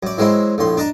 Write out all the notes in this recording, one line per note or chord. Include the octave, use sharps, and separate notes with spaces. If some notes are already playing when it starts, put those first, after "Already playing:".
F#2 D5
E3 F#3 G#3 C4 E4
A#1 A2 C6
D4 D#5 A5 A#5